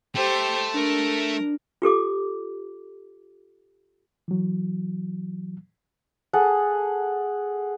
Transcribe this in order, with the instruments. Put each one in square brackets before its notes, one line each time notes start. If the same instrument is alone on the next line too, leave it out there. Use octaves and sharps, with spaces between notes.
[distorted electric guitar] A3 [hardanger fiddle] G4 C5
[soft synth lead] D4 [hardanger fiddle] A#4
[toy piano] F4 G4 A4 D6
[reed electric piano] E3 F#3
[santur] G#4 A4 F#5